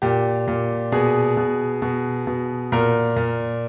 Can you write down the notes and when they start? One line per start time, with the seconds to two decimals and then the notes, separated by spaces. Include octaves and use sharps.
0.02 A#2 G4
0.48 A#2
0.92 B2 G#4
1.37 B2
1.82 B2
2.27 B2
2.72 A#2 A#4
3.17 A#2